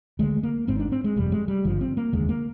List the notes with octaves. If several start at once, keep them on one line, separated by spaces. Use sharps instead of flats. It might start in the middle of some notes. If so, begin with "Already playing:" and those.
D2 D3 G#3
A#3
G#1 G#2 C4
D4
C4
G#3
G1 F2 C3 G3
G#3
G3
G#1 G2 D3 F3
C4
A#3
F1 D#2 D3 G#3
A#3